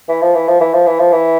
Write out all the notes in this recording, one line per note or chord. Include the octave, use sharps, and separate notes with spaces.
E3
F3
E3
F3
E3
F3
E3
F3
E3